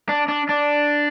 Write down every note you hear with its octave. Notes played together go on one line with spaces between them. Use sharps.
D4
D4
D4